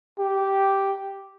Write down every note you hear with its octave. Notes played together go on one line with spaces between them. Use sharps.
G4